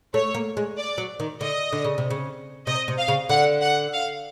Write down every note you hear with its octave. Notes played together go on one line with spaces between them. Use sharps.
A3 C#5
A#3
G#3
D5
F#3
D#3
D3 D#5
D3
C#3
C3
C#3
C3 D#5
C3
F5
C#3
D3 F#5
F#5
F5